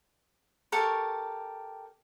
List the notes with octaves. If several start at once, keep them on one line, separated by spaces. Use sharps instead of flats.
G4 A4 A#4 C#6